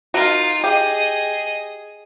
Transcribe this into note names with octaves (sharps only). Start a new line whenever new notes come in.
D#4 F4 F#4 A#4
G4 G#4 D#5